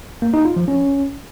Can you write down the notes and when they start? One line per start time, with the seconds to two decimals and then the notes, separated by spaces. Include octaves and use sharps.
0.22 A#3
0.34 D#4
0.45 F4
0.56 F3
0.68 C#4